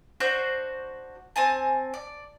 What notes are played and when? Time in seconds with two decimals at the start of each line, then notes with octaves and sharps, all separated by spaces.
0.20 D4 F#4 C5 G6
1.36 C4 G#5 A5
1.94 D5